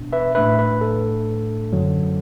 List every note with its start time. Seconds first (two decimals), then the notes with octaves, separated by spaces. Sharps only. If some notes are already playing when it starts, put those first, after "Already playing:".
Already playing: B2 B3 D4
0.13 B4 E5
0.35 A2 A3 D4 B4 E5
0.59 B4
0.81 A4
1.73 F#2 D3 F#3